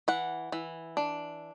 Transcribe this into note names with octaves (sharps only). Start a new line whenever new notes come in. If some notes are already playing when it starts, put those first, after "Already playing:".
E3 F#5
E3
D4